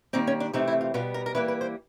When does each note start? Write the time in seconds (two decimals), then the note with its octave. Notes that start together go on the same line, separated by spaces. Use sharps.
0.13 D#3 G3 A#3 C4
0.27 C#4
0.40 D4
0.53 C3 E3 A3 C4 D#4
0.68 E4
0.81 F4
0.94 B2 G3 B3 F4
1.14 A#4
1.26 A#4
1.35 E3 G3 A#3 B4
1.48 B4
1.61 C5